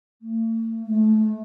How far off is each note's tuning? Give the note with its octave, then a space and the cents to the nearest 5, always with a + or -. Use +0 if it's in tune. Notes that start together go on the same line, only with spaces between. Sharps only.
A3 +40
A3 -25